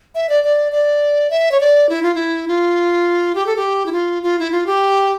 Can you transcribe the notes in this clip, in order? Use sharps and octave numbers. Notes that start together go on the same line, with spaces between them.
E5
D5
D5
D5
E5
C#5
D5
E4
F4
E4
F4
G4
A4
G4
E4
F4
F4
E4
F4
G4